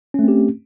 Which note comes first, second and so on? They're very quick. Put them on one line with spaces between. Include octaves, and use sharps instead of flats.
C#4 A3 C4 G4